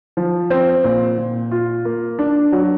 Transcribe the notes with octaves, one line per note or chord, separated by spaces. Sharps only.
F3
C4
A#2
A#2
F4
A#3
D4
F#3